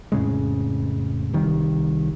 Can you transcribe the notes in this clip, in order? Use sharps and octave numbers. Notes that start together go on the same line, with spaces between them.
F2 A2 C#3 G#3
C2 D#3 G3